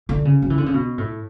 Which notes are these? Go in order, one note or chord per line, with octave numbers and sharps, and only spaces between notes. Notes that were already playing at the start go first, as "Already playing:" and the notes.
D3
C#3
F#3
E3
D3
C#3
B2
A2